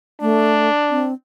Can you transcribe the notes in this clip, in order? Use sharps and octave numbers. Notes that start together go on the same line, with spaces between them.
A3 D4
C4